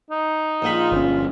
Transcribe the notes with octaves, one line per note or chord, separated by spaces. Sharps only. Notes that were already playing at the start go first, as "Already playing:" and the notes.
D#4
A#1 G#3 F4 B5
G1 C#4